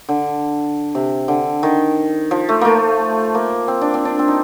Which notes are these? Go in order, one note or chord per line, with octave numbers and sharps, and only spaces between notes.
D3
C3
D3
D#3
F3
A3
A3 A#3
A#3
C4
D4
C4
D4
C4
D#4